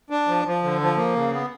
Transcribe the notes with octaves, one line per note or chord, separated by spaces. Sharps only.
D4
F3
F3
D3
F3
A#3
C#3
B3